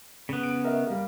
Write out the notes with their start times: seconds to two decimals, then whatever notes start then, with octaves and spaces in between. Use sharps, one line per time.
0.29 C#3 B3
0.43 D7
0.64 A#4 D#5 E5
0.87 G3 A#3